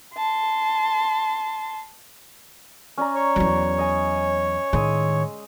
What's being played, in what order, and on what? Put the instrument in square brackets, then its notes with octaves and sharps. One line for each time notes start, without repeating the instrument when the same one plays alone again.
[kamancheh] A5 C6
[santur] C#4 D5 A#5
[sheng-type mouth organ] C#5
[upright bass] E2 F#3
[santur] D#5 G#5
[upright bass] A2 D#3 [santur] G#3 D#6 E6